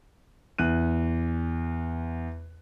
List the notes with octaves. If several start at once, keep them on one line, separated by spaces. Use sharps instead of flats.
E2 F#6 D#7